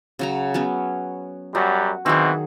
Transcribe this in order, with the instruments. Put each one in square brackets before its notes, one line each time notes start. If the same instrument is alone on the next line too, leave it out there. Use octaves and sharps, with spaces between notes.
[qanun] C#3 F#3 A#5
F#3 B3 C#4
[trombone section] F#2 F#3 G3 [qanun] F#4
[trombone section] B2 E3 C4 [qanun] D#3 F#3 G#4